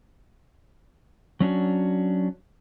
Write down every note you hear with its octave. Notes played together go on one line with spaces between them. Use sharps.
F#3 C#4 D4 F#4